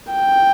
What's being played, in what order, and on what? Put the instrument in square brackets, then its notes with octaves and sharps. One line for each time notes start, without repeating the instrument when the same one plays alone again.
[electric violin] G5